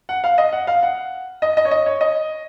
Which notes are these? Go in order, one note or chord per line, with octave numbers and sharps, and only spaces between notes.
F#5
F5
D#5
F#5
F5
F#5
D#5
D#5
C#5
D#5
C#5
D#5